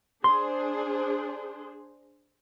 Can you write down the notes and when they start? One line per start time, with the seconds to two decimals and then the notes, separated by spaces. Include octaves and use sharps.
0.24 D4 G#4 C5 C6